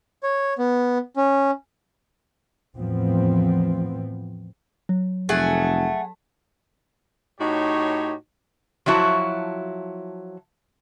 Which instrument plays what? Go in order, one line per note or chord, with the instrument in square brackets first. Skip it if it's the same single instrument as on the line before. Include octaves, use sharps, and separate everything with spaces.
[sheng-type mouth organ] C#5
B3
C#4
[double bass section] E2 A2 F3 B3 C4
[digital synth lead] F#3
[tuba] F1 [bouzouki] A3 [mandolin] G#4 F#5 G#5
[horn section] A2 D#4 F#4 G4 C#5
[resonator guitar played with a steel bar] F3 F#3 E4 F#4 A5